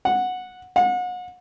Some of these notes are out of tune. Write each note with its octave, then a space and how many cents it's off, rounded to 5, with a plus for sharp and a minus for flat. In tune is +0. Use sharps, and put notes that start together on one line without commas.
F#5 -10
F#5 -35